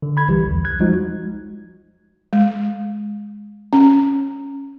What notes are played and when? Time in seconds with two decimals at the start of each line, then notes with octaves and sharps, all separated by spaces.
0.02 D3
0.17 B5 G#6
0.28 C2 E3 G3 G4
0.44 B1 E2
0.65 F#6 G#6
0.80 F3 G3 G#3 D#4 F4 F#4
2.33 G#3
3.73 C#4